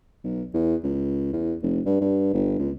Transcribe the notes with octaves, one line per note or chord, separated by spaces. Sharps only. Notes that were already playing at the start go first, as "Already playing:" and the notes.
B1
E2
C#2
E2
F1
G2
G2
G1
C#2